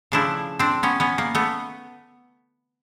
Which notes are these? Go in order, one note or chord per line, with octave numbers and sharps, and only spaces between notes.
C#3 F3 A3 D4 E4
C4 D4
B3 C#4
B3 C#4
A#3
A3 B3